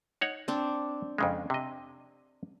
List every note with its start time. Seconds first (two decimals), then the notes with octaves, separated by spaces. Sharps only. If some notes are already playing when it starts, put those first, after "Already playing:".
0.21 D#4 C#5 F#5
0.48 C4 D4
1.18 F2 C#3 G#3
1.50 C3 D#5